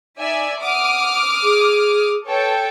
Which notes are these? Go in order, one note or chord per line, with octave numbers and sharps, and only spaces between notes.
D#4 D5 E5 G#5
F#5 D6 D#6 F6
G#4
A4 B4 C#5 G5